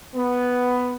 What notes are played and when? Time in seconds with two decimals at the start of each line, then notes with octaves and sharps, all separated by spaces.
0.14 B3